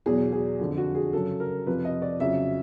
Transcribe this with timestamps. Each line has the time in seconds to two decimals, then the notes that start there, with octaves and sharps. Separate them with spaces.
0.06 E2 B2 F#3 G#4
0.32 G#4
0.59 F2 D3 F3
0.78 F#4
0.95 G#4
1.13 F#2 C#3 F#3 A4
1.40 A#4
1.67 F2 C3 F3 B4
1.85 D#5
2.02 D5
2.20 F2 C#3 F#3 E5